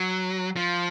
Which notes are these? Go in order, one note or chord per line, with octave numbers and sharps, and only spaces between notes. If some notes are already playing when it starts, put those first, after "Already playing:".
Already playing: F#3
F3